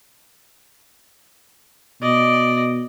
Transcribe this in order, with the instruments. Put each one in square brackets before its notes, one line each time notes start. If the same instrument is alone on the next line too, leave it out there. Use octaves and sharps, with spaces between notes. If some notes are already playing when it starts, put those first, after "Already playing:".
[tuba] B2 [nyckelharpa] D5 D#5